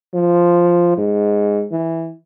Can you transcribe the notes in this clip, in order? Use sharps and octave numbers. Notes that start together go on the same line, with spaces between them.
F3
G#2
E3